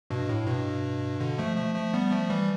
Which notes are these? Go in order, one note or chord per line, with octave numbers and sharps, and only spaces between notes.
G2 B2
A2
G2 B2
B2 D3
F3 A3
F3 A3
F3 A3
G3 B3
F3 A3
E3 G3